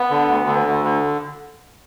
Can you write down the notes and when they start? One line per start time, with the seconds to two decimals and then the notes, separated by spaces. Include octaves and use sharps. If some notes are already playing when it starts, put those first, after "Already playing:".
Already playing: B3
0.10 D3
0.28 D2
0.47 D3
0.66 D2
0.85 D3